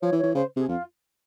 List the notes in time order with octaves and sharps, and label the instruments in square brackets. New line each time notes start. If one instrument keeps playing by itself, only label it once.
[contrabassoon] F3 [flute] C#5
[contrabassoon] E3
[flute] C#5
[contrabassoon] E3
[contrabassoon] C#3 [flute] C5
[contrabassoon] C3 [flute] G#4
[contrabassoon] F2 [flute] F4